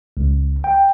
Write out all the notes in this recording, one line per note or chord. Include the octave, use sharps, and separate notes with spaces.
C#2
G5